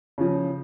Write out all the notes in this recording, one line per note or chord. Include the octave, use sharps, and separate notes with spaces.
C#3 F3